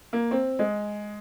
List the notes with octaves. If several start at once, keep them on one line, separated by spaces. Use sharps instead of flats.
A#3
C4
G#3